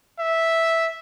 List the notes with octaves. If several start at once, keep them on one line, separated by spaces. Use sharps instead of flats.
E5